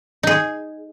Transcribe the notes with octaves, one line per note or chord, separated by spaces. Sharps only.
D#4 G#4